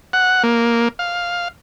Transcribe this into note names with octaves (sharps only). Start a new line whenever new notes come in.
F#5
A#3
F5